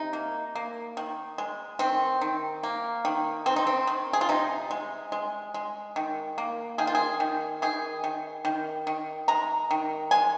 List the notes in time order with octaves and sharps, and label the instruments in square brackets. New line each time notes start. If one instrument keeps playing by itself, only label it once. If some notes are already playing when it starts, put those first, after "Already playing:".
Already playing: [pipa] C3 D#4
A#3
A#3
D#3
G#3
D#3 C4
D#3
A#3
D#3
D#3 C4
D#4
C4
D#3
G#4
F4
C3 D#4
G#3
G#3
G#3
D#3
A#3
D#3 G#4
F4
G#4
D#3
D#3 G#4
D#3
D#3
D#3
G#3 A#5
D#3
G#3 G#5